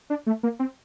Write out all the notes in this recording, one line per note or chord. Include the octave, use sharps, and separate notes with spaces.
D4
A3
A#3
C4